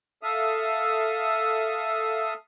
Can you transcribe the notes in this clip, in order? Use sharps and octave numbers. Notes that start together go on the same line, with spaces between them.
A4 E5 F5 D#6